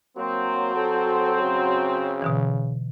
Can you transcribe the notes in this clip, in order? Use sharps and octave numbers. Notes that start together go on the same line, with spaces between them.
F#3 A#3 C4
A4
C#3
B2 D3 E3